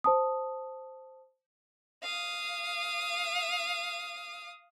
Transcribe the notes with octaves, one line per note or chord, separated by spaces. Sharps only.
C5 A5 D#6
F5 D#6